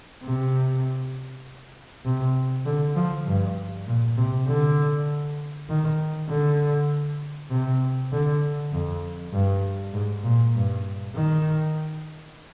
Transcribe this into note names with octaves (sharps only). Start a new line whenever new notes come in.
C3
C3
D3
F3
G2
A#2
C3
D3
D#3
D3
C3
D3
F2
G2
G#2
A#2
G2
D#3